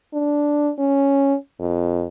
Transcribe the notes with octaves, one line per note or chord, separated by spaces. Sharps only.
D4
C#4
F2